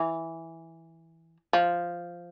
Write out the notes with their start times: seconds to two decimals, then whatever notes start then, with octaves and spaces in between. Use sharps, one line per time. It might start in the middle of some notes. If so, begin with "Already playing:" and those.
Already playing: E3
1.53 F3